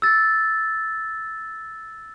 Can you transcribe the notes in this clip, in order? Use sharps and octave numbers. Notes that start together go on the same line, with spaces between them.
E6 A6